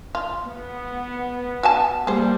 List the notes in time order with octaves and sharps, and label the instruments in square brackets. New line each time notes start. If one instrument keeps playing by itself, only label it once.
[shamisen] F4
[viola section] B3
[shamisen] F#4 G#5 A5
[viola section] G3 A#3 [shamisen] G#4 C5